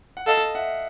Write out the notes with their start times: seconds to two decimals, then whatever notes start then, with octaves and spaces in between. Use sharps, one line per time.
0.17 F#5
0.27 A4 D#5 F5
0.55 E5 F#5